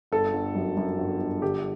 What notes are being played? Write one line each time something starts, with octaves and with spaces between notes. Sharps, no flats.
G1 A4
G1
F#2
F#2
G1
G1
D3 G4